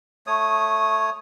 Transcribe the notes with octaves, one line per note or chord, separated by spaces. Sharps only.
A3 C#5 D#6